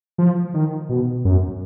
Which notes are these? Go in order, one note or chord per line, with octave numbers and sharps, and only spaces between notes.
F3
D#3
B2
F#2